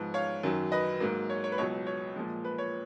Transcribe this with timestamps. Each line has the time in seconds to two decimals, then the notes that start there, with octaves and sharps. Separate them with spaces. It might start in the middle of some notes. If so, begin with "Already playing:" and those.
Already playing: G#2 F3 B3
0.14 C#5 F5
0.43 F#2 D#3 F#3
0.72 B4 D#5
1.00 G#2 F#3 A#3
1.30 C#5
1.44 C#5
1.52 B4
1.58 C#2 B2 F#3 C#5
1.87 C#5
2.16 A#2 F3 G#3
2.45 B4
2.58 C#5